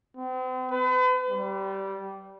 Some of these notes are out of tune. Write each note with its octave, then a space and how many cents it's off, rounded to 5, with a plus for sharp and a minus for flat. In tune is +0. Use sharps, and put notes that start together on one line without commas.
C4 -40
B4 +40
G3 -15